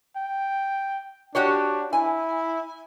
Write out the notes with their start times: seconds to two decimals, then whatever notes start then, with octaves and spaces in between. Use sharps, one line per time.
0.16 G5
1.35 D4 F#4 G4 C#5
1.93 E4 G#5